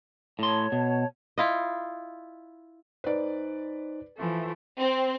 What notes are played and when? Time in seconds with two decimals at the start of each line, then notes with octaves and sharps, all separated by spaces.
0.39 A2 C#5 A5 C6
0.72 B2
1.38 E4 F4 D#5
3.04 D#4 B4 C5 D5
4.18 E3 F3 A3
4.79 C4